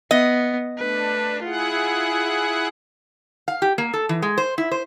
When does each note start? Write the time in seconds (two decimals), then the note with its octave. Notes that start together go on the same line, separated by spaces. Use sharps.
0.11 B3 D#5
0.78 A3 D4 B4
1.44 E4 F4 G#4 F#5
3.48 F5
3.62 G4
3.78 A#3
3.94 A4
4.09 E3
4.22 G#3
4.38 C5
4.58 E4
4.71 C5